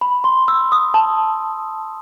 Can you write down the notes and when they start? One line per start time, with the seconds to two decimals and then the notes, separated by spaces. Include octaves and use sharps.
0.01 B5
0.24 C6
0.48 E6
0.72 D#6
0.94 A5